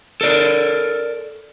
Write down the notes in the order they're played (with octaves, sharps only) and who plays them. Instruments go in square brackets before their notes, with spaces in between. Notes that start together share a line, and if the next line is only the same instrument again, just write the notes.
[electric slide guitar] A4 A#4 D5